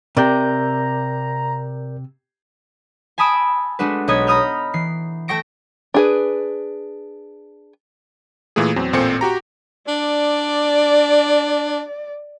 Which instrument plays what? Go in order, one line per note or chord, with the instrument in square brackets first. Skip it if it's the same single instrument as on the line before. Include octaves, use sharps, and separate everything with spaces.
[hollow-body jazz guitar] C3 [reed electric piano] A#4 D5 G6 [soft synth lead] A#5
[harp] G#5 A5 B5 D#6 E6 D7
G#3 A3 D4 F#4 B4
B1 C#5 D#5 B5 G#6
A#5 B5 D#6 F6 G6
E3 C7
A3 A4 G5 C#6 A#6 D7
[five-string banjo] D4 G#4 B4
[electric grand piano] A#2 E3 A3 A#3 G#4
E2 F#3 C4
A1 A#2 C4 A4 C5 C#7
F#4 G4 A#5
[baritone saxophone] D4 [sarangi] D5